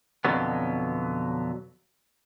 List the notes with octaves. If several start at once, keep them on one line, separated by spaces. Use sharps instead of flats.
F2 G#2 B2 D3 F#3 B3